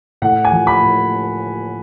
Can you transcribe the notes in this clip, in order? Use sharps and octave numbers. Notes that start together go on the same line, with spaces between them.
A2 F#5
G#5
F3
B5
A2